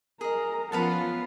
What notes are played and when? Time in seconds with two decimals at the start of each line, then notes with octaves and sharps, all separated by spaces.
0.21 G#4 A#4 D#5 A#5
0.72 F3 B3 C#4 F4 B4 F5 F#5 A5